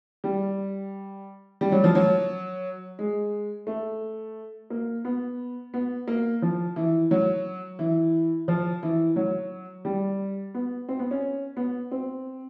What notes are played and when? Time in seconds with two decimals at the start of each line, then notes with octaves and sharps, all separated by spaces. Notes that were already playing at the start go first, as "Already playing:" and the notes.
0.24 G3
1.61 G3
1.72 F#3
1.84 F3
1.95 F#3
2.99 G#3
3.67 A3
4.70 A#3
5.05 B3
5.74 B3
6.08 A#3
6.42 F3
6.76 E3
7.11 F#3
7.79 E3
8.48 F3
8.83 E3
9.16 F#3
9.85 G3
10.54 B3
10.89 C4
10.99 B3
11.11 C#4
11.57 B3
11.91 C4